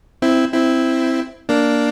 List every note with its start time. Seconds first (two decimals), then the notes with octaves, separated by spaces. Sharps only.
0.22 C4 E4
0.54 C4 E4
1.49 A#3 D4